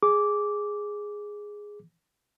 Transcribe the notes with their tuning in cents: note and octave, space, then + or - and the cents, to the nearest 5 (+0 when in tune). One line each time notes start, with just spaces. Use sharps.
G#4 +0 D6 -10